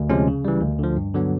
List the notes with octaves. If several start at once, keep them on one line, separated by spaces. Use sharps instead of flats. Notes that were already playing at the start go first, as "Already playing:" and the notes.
Already playing: D2
C3 F3 G#3 C#4
C#3
E3 G3
D2
D3 F3
G2
D3 F#3 B3